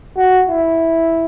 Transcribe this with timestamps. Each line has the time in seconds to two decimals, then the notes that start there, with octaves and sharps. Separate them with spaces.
0.17 F#4
0.49 E4